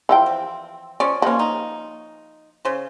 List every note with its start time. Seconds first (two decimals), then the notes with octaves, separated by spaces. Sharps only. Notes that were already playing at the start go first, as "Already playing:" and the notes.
0.09 E3 F3 G5
0.26 C4
1.00 F3 C#4 C#5 D5
1.22 B2 F3 A#3 C#4
1.39 D#4
2.65 C#3 C5